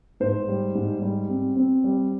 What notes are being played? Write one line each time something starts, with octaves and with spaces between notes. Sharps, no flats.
G#2 C5
G3
G#2
G3
C4
C4
G3